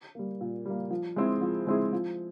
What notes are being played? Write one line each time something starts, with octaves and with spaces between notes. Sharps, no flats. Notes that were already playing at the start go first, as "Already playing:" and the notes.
G3 A#3
A#2
G3 A#3
F3
G#3 C4 E4 G#4
F3
G#3 C4 E4 G#4
F3